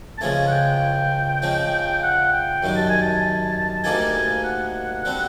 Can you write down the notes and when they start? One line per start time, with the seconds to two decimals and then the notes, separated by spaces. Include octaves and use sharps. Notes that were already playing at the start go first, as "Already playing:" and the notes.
0.18 A5
0.21 C#2 C#3 F3 A3 G#5
0.47 F#5
0.51 G5
1.42 C#3 F3 G#3
2.03 F#5
2.33 G5
2.63 F#2 D#3 G3
2.76 A5
2.89 G#5
3.02 A5
3.83 D2 D3 G3 A#3 D#4 G#5
4.14 G#5
4.44 F#5
5.05 D3 G3 C4